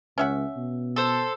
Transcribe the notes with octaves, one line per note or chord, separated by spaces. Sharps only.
C#2 C#4 E5 F#5
B2
A4 C5